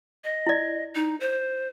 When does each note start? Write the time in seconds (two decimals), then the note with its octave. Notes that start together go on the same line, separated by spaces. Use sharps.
0.24 D#5
0.47 E4 D5
0.95 D#4
1.20 C5